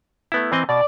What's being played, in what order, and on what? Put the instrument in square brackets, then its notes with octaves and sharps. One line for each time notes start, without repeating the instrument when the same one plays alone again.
[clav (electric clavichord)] A3 B3 E4
E3 C4 D#5
[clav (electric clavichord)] B2 [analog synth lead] D5